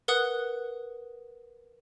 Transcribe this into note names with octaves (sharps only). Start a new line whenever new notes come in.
A#4 B4 F#5 D#6 F#6